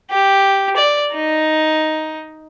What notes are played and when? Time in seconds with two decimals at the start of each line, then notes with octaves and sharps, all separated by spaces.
0.11 G4
0.77 D5
1.14 D#4